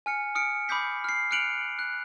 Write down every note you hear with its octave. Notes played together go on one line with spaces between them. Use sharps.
G#5 F6 C#7
D#6 F6 C#7 D7
B5 D6 D#6 G6 B6 C7
F6 C7
F6 F#6 C#7 D7 F7 F#7
F#6